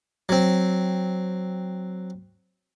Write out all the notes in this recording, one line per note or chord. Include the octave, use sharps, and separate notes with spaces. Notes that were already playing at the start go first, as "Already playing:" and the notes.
F#3 C4